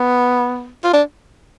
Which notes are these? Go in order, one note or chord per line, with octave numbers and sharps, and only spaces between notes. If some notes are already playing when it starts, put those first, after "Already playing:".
Already playing: B3
F4
D4